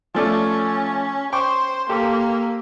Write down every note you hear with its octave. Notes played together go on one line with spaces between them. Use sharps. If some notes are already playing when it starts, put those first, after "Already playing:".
F3 A3 C#4 D5
C5 G5 C#6 D6
A#3 G4 A4